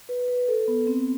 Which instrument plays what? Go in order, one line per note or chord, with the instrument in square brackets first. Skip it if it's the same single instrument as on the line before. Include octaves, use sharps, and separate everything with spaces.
[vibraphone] B4
B4
A4
B3
C4